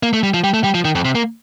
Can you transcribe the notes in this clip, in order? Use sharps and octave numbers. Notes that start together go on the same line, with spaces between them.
A#3
A3
G3
F3
G3
A3
G3
F3
D#3
F2
C3
A#3